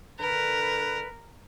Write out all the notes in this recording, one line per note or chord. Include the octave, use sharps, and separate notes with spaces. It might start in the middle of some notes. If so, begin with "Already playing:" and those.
D3 A#4 B4